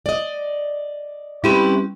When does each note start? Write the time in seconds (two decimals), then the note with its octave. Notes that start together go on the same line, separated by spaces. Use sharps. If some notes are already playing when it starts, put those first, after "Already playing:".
0.06 D5 D#5
1.44 G3 C4 C#4 E4 G4 B4